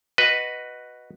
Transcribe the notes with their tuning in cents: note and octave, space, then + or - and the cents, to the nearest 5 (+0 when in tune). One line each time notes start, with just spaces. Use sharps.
F#4 +0 B4 +0 D#5 +0